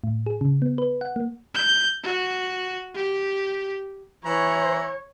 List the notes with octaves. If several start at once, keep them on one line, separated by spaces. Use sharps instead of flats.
A2
G#4
C#3
B3
B4
F#5
A#3
G6
F#4
G4
E3 C#5 A#5